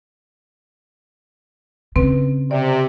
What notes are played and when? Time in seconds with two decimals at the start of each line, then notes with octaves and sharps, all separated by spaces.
1.96 C#3 C4 B4
2.51 C3 D5